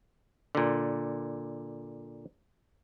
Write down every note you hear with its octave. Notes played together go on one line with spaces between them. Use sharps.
A#2 D3